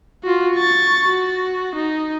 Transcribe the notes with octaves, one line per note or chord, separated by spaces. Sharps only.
F4 F#4
C#6 A6
F#4
D#4